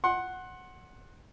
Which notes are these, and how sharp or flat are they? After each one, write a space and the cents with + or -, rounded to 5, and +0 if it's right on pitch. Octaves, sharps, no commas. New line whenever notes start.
F#5 +0 C6 +30